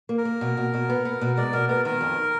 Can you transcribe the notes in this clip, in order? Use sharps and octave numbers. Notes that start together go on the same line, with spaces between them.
A#3
A#4
A#3
B2
B2
B2
B3
B3
B2
G#3 D5
B2 A#4
B3 A#4
D#3 A#4
F2